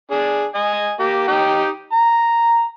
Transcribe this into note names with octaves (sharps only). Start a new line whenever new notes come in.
D4 G#4
D#5 G#5
A#3 G4
D#4 G4 G5
A#5